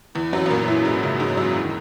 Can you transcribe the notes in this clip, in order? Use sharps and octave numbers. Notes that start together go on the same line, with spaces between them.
E2 E3
F#2 F#3
B3
A#2 A#3
E3 E4
G#2 G#3
C#3
G#2 G#3
F#2 F#3
E3
D#3